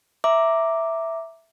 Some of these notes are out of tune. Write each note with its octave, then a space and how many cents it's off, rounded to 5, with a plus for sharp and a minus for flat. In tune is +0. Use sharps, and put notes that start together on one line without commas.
E5 +0 A#5 +0 D6 +0